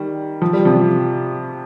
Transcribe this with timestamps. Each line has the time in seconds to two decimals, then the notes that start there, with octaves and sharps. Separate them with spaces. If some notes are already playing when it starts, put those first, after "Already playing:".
Already playing: D#3 G3
0.42 F3
0.53 G3
0.65 C3 F3